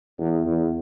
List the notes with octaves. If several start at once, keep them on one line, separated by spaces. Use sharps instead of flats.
E2
E2